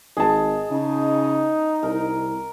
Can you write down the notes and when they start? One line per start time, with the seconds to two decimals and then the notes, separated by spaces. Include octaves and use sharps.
0.17 G#1 G#4 D#5 A5
0.71 C#3 D#4
1.83 C2 A#4